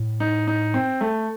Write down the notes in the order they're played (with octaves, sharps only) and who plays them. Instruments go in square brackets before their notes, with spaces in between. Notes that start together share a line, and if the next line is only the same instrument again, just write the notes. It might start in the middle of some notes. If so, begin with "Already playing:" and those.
Already playing: [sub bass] A2
[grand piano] D#4
D#4
C4
A3